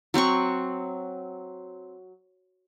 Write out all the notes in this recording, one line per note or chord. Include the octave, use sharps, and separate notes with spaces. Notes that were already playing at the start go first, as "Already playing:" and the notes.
F#3 C4 F#5 C#6